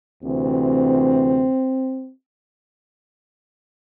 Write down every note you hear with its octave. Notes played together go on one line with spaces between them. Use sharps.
D2 C3 E3 C4